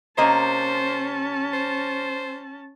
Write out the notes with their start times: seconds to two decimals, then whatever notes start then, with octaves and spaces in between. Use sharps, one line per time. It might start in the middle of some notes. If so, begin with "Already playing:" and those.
0.18 C3 A#3 C#4 C5 D#5 A5
1.53 C5